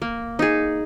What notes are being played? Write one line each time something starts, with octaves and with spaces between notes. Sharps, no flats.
A#3
D#4 G#4